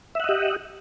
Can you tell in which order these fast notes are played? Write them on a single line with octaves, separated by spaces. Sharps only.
E5 F#5 D#5 G4